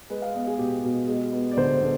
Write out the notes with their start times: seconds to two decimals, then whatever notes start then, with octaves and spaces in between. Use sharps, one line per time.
0.10 G#3 B4
0.22 F5
0.34 B3 D#5
0.47 G#4
0.58 B2 G4
0.83 B2
1.07 G#3
1.33 B3
1.52 D5
1.57 D3 C5
1.81 D3